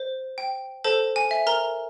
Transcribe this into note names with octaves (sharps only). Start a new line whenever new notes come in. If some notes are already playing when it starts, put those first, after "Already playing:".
Already playing: C5
G5
A4 C5 A5
G#5
E5
A#4 A#5